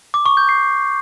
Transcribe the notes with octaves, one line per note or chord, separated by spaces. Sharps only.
D6
C#6
G6
C7